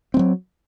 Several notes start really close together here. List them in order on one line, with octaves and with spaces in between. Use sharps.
C4 G3 F#3